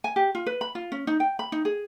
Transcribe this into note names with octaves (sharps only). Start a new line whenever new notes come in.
G#5
G4
F4
B4
B5
F4
C#4
D#4
G5
B5
D#4
G#4